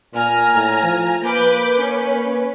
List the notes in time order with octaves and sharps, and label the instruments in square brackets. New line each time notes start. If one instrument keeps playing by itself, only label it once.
[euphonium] A#2 [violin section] G#5 A#5 F6
[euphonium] A2
F3
[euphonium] A#3 [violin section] B4 D6 G6
[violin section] C#4 B4